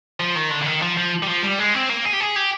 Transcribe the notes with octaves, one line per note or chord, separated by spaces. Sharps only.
F3
D#3
D3
D3
D#3
F3
F3
G3
F3
G3
G#3
C4
A#3
G#4
G4
G#4
G4